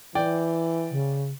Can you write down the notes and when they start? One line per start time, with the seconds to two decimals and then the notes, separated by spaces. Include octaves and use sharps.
0.15 E3 D5 G5
0.91 C#3